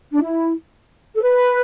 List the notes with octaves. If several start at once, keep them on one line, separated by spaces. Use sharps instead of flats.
D4
E4
A4
B4